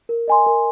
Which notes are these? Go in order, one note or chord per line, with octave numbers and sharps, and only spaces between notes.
A#4
D#5 G#5 C6
A#4